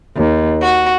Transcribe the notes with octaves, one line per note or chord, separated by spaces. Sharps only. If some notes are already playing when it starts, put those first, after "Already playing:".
D#2
F#4